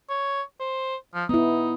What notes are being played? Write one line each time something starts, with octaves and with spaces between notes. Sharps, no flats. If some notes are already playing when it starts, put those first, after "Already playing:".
C#5
C5
F3
B3 D#4 E4